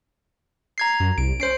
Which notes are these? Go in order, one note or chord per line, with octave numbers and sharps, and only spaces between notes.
A#5 G#6 C7
F#2
C2 D7
C#4 C5 C7 D7